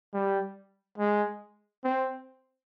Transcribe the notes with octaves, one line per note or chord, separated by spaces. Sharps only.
G3
G#3
C4